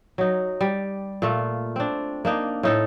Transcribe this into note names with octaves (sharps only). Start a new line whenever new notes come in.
F#3 D#4
G3
A#2 A3 F4
C4 D4
A#3 D4 D#4
A2 D#4 A4